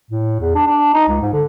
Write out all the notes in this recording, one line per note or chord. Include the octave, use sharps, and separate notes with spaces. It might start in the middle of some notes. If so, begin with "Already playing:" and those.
A2
E2
D4
D4
D#4
C#2
G#2
D3